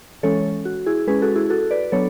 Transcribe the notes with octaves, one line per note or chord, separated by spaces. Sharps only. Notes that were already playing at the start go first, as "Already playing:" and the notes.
E3 G#3 C#4 A4 C#5
F#4
E4 G#4
G#3 C#4 G#4 B4
F#4 A4
E4 G#4
F#4 A4
B4 D5
F#3 B3 D4 A4 C#5